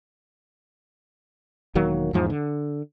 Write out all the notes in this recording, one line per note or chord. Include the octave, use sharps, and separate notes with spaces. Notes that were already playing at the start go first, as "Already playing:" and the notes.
E1 D#3 F#3 A#3
E2 G#2 F3
D3